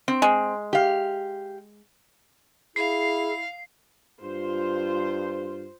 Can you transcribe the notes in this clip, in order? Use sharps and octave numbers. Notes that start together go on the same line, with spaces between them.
C4
G#3
G4 F5
E4 G#4 F5 C7
G2 F4 C5